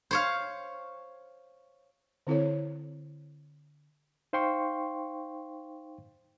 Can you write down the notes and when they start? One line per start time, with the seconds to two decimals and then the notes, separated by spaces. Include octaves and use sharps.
0.11 C5 C#5 F5
2.27 D3 C4 E4 A4 C#5
4.33 D#4 C5 F5 G5 C6 C#6